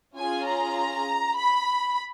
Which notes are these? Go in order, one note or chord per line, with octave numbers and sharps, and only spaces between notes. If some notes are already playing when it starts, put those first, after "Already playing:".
C#4 F4 G#4 G#5
A#5
B5